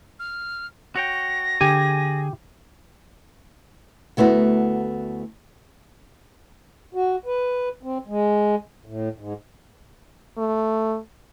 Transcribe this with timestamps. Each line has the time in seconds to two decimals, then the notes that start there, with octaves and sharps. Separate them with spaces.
0.19 F6
0.95 F#4 C#5 G5 A#6
1.61 D3 G4 G#4 G#5
4.17 D2 A3 B3 E4 F#4
6.94 F#4
7.26 B4
7.83 C4
8.07 G#3
8.86 A2
9.18 G#2
10.38 A3